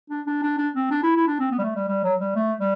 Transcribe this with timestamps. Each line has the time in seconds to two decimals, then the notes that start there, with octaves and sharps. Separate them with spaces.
0.10 D4
0.27 D4
0.43 D4
0.58 D4
0.75 C4
0.91 D4
1.03 E4
1.16 E4
1.27 D4
1.40 C4
1.52 B3
1.59 G3
1.64 A3
1.76 G3
1.88 G3
2.04 F#3
2.20 G3
2.36 A3
2.60 G3